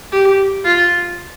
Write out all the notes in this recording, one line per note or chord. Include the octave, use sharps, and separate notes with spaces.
G4
F4